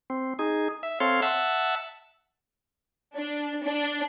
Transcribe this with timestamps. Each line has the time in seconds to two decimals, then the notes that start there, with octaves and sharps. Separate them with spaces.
0.10 C4
0.39 D#4 G#4
0.83 E5
1.00 C4 A4 C#5 F5 C6
1.22 E5 F#5 A5 E6
3.16 D4
3.63 D4